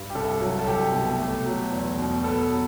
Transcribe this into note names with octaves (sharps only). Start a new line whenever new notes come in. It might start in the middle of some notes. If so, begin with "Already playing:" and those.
Already playing: G2
G4
C2 A4
F#3
A4
C2 G4
B2
A3
F#3
E2
B2
B3 A4
F#3